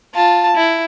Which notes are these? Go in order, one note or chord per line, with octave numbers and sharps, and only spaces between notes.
F4 A5
E4